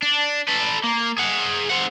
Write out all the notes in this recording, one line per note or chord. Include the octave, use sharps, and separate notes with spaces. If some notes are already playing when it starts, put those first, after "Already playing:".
D4
A4 B4
A#3
G#4 F#5
C4 F#5